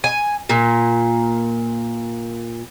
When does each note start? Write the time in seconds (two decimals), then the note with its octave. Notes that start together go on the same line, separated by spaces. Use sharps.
0.04 G#5
0.49 A#2